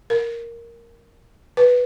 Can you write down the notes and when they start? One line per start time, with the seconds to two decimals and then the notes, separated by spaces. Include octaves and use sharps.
0.10 A#4
1.57 B4